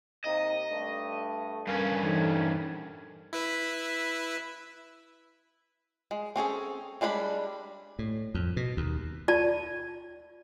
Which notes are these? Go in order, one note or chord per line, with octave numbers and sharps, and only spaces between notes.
C3 A#3 D#4 D#5
G2 A3 D4
G2 C#4 A#4 F5 G#5
C#2 C3 E3 A3 D#4 A4
E4 B4 E5
G#3
C4 C#4 G#4 A4
G3 G#3 D4 B4 B5
A2
F2
B2
D#2
F4 D5 A5